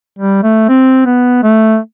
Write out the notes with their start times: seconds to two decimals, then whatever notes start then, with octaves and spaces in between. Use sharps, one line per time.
0.19 G3
0.43 A3
0.69 C4
1.06 B3
1.43 A3